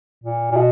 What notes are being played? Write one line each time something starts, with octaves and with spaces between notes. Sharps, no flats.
A#2
A#2
B2